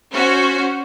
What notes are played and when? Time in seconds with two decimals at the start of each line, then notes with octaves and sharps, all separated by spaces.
0.13 C#4 F#4 C5